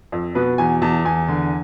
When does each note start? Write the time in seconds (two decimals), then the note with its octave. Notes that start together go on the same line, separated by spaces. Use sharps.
0.12 F2
0.35 B2 B4
0.58 E2 G#5
0.82 E2 A5
1.05 E2 G#5
1.28 D3